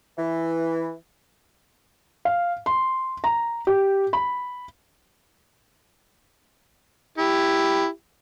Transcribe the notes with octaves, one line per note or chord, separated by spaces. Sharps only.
E3
F5
C6
A#5
G4
B5
E4 G4